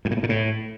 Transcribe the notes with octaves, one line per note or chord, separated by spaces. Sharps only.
G2
A#2
A2
A#2
A2